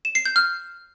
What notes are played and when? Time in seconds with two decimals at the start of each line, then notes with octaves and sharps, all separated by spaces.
0.05 E7
0.15 C7
0.25 G6
0.36 F6